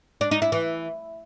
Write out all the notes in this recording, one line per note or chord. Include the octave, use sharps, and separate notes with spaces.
D4
D#4
E4
E3